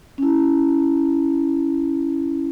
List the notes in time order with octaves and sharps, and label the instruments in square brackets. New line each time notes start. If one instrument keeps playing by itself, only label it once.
[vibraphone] C#4 E4